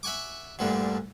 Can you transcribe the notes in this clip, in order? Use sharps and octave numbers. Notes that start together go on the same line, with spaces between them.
E5 F#5 G#5 C#6 D6
D2 G2 A#2 D3 G3 A3